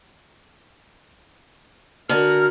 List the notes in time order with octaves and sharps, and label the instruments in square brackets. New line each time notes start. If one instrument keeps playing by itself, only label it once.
[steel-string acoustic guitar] D3 F#4 A#4 [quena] F6